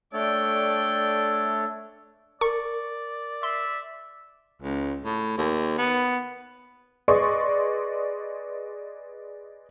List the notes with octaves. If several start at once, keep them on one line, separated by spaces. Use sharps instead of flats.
A3 D4 A4 C#5 D5 G5
A#4 D5 C#6
E5 C6
C#2
A2
D#2
B3
G#4 B4 D5 D#5 C6 C#6